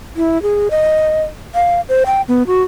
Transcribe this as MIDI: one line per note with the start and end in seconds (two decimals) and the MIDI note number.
0.17 0.41 64
0.42 0.68 68
0.71 1.23 75
1.55 1.81 77
1.89 2.03 72
2.06 2.21 79
2.28 2.46 59
2.47 2.62 66